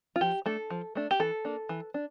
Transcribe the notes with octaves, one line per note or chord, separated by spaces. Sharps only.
F4
F3 G4
A3 D4 A4
F3
A3 D4
G4
E3 A4
A#3 D4
E3
D4